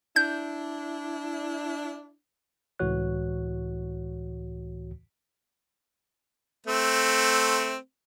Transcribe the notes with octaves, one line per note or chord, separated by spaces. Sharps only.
D4 E4 G6
C#2 A2 E3 F#4 C#5 F#6
A3 C4